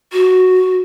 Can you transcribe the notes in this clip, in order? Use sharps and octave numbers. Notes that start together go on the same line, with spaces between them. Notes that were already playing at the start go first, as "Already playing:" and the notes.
F#4